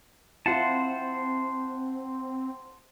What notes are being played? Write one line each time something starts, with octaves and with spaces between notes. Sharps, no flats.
C4 E4 F4 C5 F#5 A5